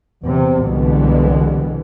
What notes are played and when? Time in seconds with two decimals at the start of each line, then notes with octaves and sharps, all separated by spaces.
0.23 E2 C3
0.65 C2 B2 D3 E3 G3 G#3